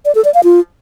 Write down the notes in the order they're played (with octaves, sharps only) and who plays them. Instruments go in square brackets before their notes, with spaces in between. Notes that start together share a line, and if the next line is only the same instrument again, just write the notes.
[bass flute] D5
A4
D5
F5
F4